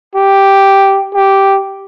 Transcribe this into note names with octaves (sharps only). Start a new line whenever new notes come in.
G4
G4